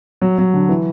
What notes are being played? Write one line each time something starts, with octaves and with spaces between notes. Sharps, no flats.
F#3
F#3
D3
E3